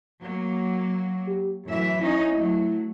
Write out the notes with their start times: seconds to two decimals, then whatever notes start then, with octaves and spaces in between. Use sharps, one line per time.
0.21 F#3 A#3
1.27 G4
1.66 F#2 A2 E3 E5
2.00 C#4 D#4 E4
2.35 F#3 A3